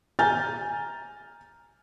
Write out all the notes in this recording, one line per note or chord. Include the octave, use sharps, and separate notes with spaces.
G#5 A#5 F6 G6 A6